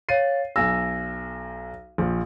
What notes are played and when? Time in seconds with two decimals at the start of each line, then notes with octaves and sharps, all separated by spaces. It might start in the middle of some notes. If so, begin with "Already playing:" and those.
0.09 C#5 F5 A6 C7 D#7
0.56 B1 G#5 E6 A#6
1.98 A#1 F3